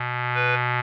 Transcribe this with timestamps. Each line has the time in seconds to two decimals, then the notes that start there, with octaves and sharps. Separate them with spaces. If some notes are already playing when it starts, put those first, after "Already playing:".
Already playing: B2
0.35 B4